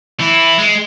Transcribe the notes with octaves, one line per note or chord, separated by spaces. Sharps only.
E3 E4
G#3